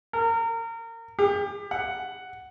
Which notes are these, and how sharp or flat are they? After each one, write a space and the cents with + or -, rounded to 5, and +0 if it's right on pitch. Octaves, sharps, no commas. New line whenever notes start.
A#4 -30
G4 +30
F#5 +5